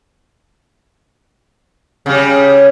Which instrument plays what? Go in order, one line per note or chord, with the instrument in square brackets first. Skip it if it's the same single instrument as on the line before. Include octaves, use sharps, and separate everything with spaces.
[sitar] C#3 G3